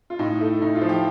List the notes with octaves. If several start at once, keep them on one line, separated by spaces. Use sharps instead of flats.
F4
A2 D#4
A3
A2 D#4
F4
F3
G4